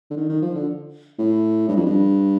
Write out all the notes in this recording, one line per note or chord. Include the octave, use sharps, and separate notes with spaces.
D3
D#3
D#3
F3
D3
A2
G2
F2
G2